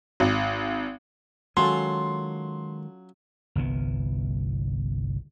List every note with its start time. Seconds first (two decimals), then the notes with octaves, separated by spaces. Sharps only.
0.20 G#1
1.57 D#3 F#3 G#3 C#4 F4 A4 C6
3.55 G1 C2 E3 B3